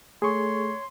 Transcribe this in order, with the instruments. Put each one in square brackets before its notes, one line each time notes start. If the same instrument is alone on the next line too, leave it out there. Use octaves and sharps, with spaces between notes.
[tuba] A3 [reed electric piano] G#4 C#6 [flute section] C#5 C6